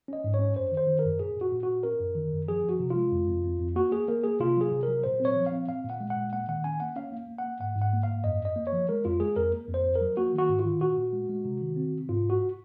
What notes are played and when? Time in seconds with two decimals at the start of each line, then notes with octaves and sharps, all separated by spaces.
0.08 C#4 D#5
0.24 G#2
0.34 C#5
0.39 C#4
0.56 F#2 C5
0.72 D#3
0.77 C5
0.87 D#3
0.99 A#4
1.04 F#2
1.19 A#2 G#4
1.36 A#2
1.41 F#4
1.52 A#2
1.63 A#2 F#4
1.83 C#4 A#4
2.00 F#2
2.15 D#3
2.32 F#2
2.48 F3 G#4
2.63 F3
2.69 F#4
2.80 C3
2.90 G#3 F4
3.11 F2
3.28 F2
3.44 F2
3.59 F2
3.76 A#3 F#4
3.92 A#3 G#4
4.08 A#3 A#4
4.24 A#3 G#4
4.40 C3 F4
4.57 F#3 G#4
4.72 C3
4.83 F#3 A#4
5.04 A#2 C5
5.20 C4
5.25 C#5
5.36 F3
5.46 F5
5.52 C4
5.68 A#2 F5
5.84 A#2
5.90 F#5
6.01 G#3
6.10 F#5
6.16 A#2
6.32 A#3 F#5
6.48 D#3 F#5
6.64 C#4 G#5
6.80 A#3 F#5
6.96 C#4 F5
7.12 A#3
7.28 A#3
7.38 F#5
7.44 A#3
7.60 G#2 F#5
7.76 G#2
7.82 F#5
7.93 A#3
8.03 G#2 F5
8.24 F#2 D#5
8.41 F#2 D#5
8.56 A#3
8.67 C#5
8.72 F3
8.89 G#3 A#4
9.05 F2 F4
9.20 G#3 G#4
9.36 F2 A#4
9.53 A#3
9.68 F2
9.74 C5
9.84 F2
9.96 A#4
10.01 F#3
10.17 A#3 F#4
10.33 D#3
10.39 F#4
10.49 G#2
10.60 F4
10.65 D#3
10.80 A#2 F#4
10.97 A#2
11.13 G#3
11.29 G#3
11.45 C3
11.61 D#3
11.76 C4
11.93 C3
12.09 G#2 F4
12.24 G#2
12.30 F#4